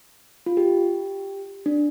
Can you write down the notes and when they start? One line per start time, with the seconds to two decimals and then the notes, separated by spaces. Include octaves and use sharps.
0.46 F4
0.57 G4
1.66 D4